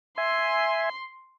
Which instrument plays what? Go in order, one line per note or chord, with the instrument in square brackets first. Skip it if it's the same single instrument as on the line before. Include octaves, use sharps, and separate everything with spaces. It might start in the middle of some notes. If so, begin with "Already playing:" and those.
[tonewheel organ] E5 G#5 [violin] C6